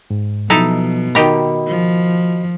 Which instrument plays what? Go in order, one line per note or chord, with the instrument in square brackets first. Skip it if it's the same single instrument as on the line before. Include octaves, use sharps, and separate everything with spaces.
[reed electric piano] G#2
[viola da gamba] B2 [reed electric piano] F3 F#3 [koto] D#4 E4 A4
[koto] D#3 G4 A#5 [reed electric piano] F#4 D#5 B5
[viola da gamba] F3